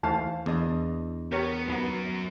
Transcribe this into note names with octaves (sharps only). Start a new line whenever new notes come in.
D#2 E3 A3 C5 F5 A5
E2 D4 D#5
B3 G4 A#4 C#5
D#2 F#3 B3 A#4